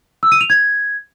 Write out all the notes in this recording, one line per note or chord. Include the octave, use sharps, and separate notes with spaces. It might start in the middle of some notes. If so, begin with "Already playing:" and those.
E6
D#7
F7
G#6